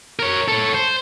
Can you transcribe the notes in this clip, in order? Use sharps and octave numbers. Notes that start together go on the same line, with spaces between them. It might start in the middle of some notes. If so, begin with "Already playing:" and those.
A#4 C#5
A4 C#5
C5